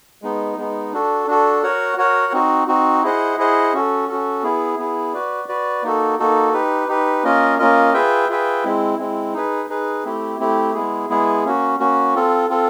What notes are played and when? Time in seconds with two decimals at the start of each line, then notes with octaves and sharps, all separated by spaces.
0.22 G#3 B3 D#4
0.57 G#3 B3 D#4
0.92 D4 F#4 A4
1.27 D4 F#4 A4
1.63 F#4 A#4 C#5 F#5
1.97 F#4 A#4 C#5 F#5
2.33 C4 D#4 F#4
2.68 C4 D#4 F#4
3.02 E4 G#4 C5 D#5 F#5
3.37 E4 G#4 C5 D#5 F#5
3.74 C#4 F#4 A4
4.09 C#4 F#4 A4
4.43 B3 E4 G#4
4.78 B3 E4 G#4
5.13 F#4 B4 D5
5.49 F#4 B4 D5
5.83 A#3 D#4 F#4 A4
6.19 A#3 D#4 F#4 A4
6.53 D#4 G4 B4
6.88 D#4 G4 B4
7.24 A#3 C#4 F4 A#4 D#5
7.59 A#3 C#4 F4 A#4 D#5
7.94 F4 G#4 B4 E5 G5
8.29 F4 G#4 B4 E5 G5
8.64 G#3 C4 E4
8.99 G#3 C4 E4
9.33 D#4 G#4 B4
9.69 D#4 G#4 B4
10.05 A3 C4 E4 G4
10.39 A3 C4 E4 G4
10.74 G#3 B3 E4 G#4
11.09 G#3 B3 E4 G#4
11.44 A#3 C#4 F#4
11.79 A#3 C#4 F#4
12.15 C4 F4 A4
12.50 C4 F4 A4